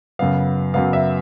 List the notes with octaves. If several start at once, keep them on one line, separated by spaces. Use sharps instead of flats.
F#2 C#3 F#3 B3 F5
F#2 C#3 F#3 B3 F5
E5